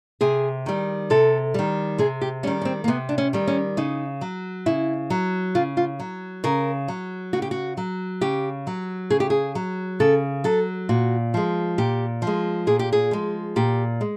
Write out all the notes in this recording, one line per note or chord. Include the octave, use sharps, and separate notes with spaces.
C3 G#4
D#3 G3
C3 A4
D#3 G3
C3 G#4
G4
D#3 G3 C#4
C#4
C4
A#3
C3 B3
D4
C#4
D#3 G3
C#4
C#3 D#4
F#3
C#3 E4
F#3
C#3 F4
F4
F#3
C#3 A#4
F#3
C#3 F#4
G4
F#4
F#3
C#3 G4
F#3
C#3 G#4
G4
G#4
F#3
C#3 A4
F#3 A4
A#2 F#4
F3 G#3
A#2 G4
F3 G#3
A#2 G#4
G4
G#4
F3 G#3
A#2 G4
G#3